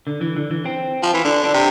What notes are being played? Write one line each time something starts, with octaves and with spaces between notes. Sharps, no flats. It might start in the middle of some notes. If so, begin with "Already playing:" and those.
D3
E3
D3
E3
C4
F3
E3
D3 D4
D4
C3